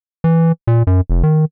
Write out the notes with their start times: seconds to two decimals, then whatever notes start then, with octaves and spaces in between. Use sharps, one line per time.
0.24 E3
0.67 A#2
0.87 F#2
1.10 F1
1.23 D#3